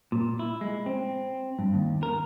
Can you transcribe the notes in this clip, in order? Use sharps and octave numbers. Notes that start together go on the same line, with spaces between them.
A#2
E4
G#3
C4
G2
D#2
A#4